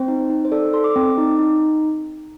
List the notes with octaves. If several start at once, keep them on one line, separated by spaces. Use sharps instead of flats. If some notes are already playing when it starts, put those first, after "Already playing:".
Already playing: C4 C5
D#4
D#4
C5
A4 D5
A4 C6
D6
C4
D#4
D#4